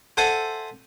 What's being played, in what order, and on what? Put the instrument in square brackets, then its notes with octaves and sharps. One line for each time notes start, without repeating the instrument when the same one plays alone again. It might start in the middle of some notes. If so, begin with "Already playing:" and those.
[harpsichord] A4 C5 E5 F#5 G#5 A5